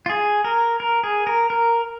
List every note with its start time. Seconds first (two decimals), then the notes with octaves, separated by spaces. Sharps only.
0.06 F4
0.10 G#4
0.44 A#4
0.80 A#4
1.04 G#4
1.27 A#4
1.50 A#4